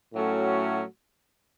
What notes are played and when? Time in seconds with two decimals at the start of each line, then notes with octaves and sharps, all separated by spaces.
0.13 A2 F#3 A3 C#4 F#4